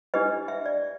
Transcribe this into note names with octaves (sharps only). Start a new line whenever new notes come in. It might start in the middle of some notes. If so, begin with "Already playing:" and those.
D4 G4 B4 D#5
E5
D5